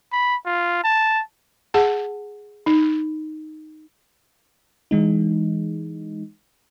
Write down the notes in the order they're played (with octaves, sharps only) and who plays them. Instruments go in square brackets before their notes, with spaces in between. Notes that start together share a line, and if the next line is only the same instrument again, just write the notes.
[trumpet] B5
F4
A5
[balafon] G#4 F#5 A5
D#4
[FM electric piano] E3 G#3 D#4